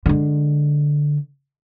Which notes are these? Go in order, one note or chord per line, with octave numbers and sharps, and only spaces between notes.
D3 G#3